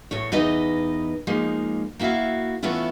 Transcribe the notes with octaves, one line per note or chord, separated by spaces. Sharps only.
E2 A2 C#5
E2 D#4 B4 D#5
F3 G#3 A#3 D#4
A#3 E4 F#4 E5 F5
E3 A3 B3 C#4 E4 F4